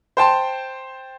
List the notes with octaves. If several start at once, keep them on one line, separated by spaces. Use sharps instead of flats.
C5 G5 A5 C6